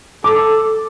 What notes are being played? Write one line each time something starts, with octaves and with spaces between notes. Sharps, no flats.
A4 D6